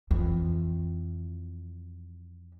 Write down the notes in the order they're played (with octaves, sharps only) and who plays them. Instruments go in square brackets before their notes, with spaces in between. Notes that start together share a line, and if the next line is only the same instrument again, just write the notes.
[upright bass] F2 E3